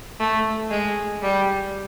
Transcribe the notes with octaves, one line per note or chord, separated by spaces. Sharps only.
A3
G#3
G3